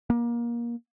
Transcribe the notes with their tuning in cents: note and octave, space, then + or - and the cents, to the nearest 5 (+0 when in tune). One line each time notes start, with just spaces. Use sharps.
A#3 +25